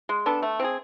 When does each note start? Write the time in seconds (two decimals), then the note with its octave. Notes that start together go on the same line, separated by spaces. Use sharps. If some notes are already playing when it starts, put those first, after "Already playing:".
0.09 G#3
0.26 B3 D4 A4
0.42 A3
0.60 C4 F4 G#4